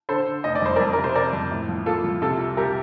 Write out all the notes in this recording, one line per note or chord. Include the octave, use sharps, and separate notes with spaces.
D3 A4 C5
D3
F1 D#5
D5
F2 C5
F2 A#4 D5
C3 A#4
C5
C3 A#4 D5
F2
A2
F3
A#3 F4 A4
F3
C3 F4 A4
C2
C2 G4 A#4